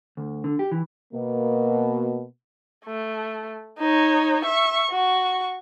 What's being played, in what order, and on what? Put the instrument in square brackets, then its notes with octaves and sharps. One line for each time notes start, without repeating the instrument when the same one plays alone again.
[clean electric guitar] D2
D3
G4
E3
[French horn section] B2 A#3
[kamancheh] A3
D#4 C#5
E5 C#6
F#4 C#6